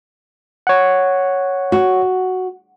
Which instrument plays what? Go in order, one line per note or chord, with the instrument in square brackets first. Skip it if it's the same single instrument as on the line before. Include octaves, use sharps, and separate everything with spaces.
[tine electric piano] C#5 F#5
[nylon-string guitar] F#4